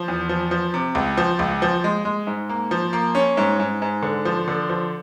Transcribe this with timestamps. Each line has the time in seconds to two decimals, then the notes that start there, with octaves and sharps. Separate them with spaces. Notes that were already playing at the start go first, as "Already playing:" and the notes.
Already playing: F3
0.08 E2
0.29 F3
0.51 F3
0.74 C3
0.95 C#2
1.17 F3
1.39 C#2
1.62 F3
1.84 G#3
2.05 G#3
2.27 G#2
2.49 A#3
2.71 F3
2.93 A#3
3.15 C#4
3.37 G#2
3.60 G#2
3.82 G#2
4.03 D3
4.25 F3
4.48 D3
4.69 F3